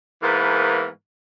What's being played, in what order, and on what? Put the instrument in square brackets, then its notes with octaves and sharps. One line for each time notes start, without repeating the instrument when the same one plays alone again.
[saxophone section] G#2 E3 A#3 B3 A#4